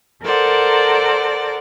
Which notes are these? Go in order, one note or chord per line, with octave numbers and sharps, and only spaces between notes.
A4 A#4 C5 D5 F#5